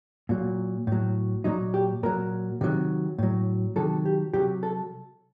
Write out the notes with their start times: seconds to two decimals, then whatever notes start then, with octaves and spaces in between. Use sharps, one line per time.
0.29 A#2 F#3
0.87 A2 F#3
1.44 A#2 F#3 D#4
1.74 G4
2.03 A#2 F#3 A#4
2.61 C3 D#3 F#3
3.18 A2 F#3
3.76 C3 D#3 F#3 A4
4.05 G4
4.34 C3 F#3 G4
4.63 A4